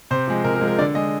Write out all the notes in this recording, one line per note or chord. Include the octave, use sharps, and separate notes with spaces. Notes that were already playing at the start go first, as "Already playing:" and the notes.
C3 C5
F3 G#3
C3 A#4
A#4
F3 G#3
A#4
D3 D5
G#3 D#5